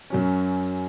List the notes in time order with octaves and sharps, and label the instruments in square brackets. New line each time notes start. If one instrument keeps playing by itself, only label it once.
[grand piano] F#2 F#3 C#4